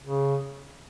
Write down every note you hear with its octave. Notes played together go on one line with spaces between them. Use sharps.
C#3